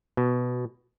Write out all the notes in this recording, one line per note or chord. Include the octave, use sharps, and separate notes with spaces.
B2